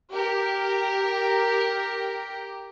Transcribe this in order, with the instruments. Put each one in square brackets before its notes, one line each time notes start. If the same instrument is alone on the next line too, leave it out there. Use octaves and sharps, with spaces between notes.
[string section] G4 A#4